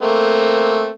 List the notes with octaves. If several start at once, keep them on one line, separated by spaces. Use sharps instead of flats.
A3 A#3 C4